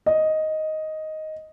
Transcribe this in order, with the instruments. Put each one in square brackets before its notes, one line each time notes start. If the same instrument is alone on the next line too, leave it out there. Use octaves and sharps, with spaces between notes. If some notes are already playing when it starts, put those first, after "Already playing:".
[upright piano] D#5